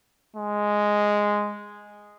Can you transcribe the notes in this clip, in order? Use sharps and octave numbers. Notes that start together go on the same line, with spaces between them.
G#3